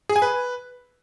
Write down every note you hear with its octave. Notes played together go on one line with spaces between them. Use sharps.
G#4
G#5
B4